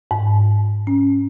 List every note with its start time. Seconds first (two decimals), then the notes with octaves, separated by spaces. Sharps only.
0.11 G#2
0.87 C#4